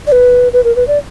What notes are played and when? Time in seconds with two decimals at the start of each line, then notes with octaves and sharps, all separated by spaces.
0.07 D5
0.12 B4
0.53 B4
0.64 A#4
0.76 B4
0.87 D5